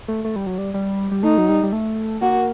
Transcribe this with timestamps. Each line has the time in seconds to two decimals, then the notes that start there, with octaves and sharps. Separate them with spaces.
0.08 A3
0.24 A3
0.36 G3
0.47 F#3
0.58 G3
0.74 G3
1.11 G3
1.23 A3 D#4
1.38 F#3
1.49 G3
1.63 G3
1.72 A3
2.21 A#3 F#4